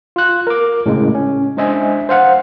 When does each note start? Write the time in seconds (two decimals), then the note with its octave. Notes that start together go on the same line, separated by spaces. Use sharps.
0.16 F4 F#6
0.47 A#4 D6
0.86 A2 C#3 G#3
1.15 C#4
1.56 G#3 D4 C5 D#5 E5 G#5
2.09 C5 F5 F#5